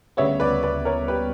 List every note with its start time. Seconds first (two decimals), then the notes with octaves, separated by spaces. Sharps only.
0.17 D2 C#3 G3 B3 C#5 E5
0.40 B4 D5
0.63 B4 D5
0.85 A#4 C#5
1.08 G4 B4